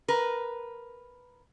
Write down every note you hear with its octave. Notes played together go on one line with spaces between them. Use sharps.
A#4 B4